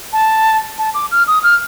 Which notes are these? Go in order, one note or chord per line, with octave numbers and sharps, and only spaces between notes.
A5
A5
D6
F6
D#6
F6